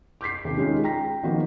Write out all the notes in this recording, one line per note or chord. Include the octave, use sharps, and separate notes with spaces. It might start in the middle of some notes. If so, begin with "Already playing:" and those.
D6 G6 B6 C7
D#2 C3
G#3 C#4 D#4 F4 G#4
G5 A#5 A#6 B6
D#3 F3 A#3 B3 F#4